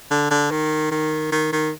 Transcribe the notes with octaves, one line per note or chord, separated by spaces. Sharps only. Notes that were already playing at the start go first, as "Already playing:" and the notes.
D3
D3
D#3
D#3
D#3
D#3